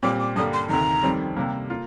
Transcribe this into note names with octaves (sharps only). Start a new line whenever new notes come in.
A#2 G3 C4 G4 D6
D6
G2 D3 G3 A#3 D#6
C6
D2 C3 D#3 A#5
F2 D#3 G3 C4
C3 G3 A#3
A#3 F4